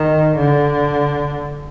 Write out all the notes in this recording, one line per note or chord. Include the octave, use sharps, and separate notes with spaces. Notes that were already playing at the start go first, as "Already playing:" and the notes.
Already playing: D#3
D3